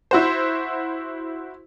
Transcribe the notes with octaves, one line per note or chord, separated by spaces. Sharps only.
E4 F#4 C5